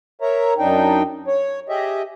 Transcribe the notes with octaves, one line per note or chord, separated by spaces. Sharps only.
A#4 C#5 E5 A#5
F#2 D4 D#4 G5
C#5
G4 G#4 D#5 E5